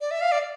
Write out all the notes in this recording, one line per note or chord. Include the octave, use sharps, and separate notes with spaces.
D5
E5
F5
D5